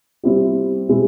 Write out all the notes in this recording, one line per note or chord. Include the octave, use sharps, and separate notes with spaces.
G3 C4 E4 G4
B2 G#3 C4 E4 G4